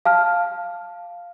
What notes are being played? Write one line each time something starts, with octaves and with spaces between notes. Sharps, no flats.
F5 A5 F6